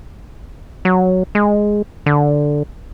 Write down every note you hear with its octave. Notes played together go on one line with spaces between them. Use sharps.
F#3
G#3
D3